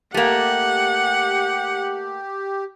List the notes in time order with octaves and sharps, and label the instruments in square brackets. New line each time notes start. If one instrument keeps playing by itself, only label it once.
[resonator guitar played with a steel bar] A3 A#3 [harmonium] G4 [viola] F#5